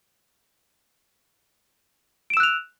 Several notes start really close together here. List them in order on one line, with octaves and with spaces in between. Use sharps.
D7 E7 E6 F#6 F7